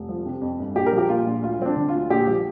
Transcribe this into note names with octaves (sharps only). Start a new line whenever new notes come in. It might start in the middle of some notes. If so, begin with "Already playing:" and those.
Already playing: F1
F3
C3
F2
G1
A#1 G4
A#4
F3 G4
A#2 F4
A#1
D2 F4
F3 C4
D4
D3
F4
D2
A#1 G4
F3